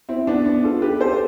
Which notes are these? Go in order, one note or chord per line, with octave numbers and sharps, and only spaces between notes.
C4 E4
B3 D4
B3 D4
F4 A4
G4 B4
A4 C5